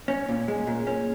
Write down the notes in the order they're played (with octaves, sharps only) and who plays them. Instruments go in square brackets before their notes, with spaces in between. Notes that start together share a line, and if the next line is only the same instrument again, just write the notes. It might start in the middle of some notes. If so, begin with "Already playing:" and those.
[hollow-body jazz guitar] C#4
A#2
G#3
A#2
C#4